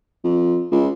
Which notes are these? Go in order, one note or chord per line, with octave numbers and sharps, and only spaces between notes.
F2
C#2